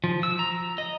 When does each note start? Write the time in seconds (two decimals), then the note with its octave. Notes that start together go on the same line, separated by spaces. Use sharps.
0.04 F3
0.23 E6
0.39 A#5
0.78 D#5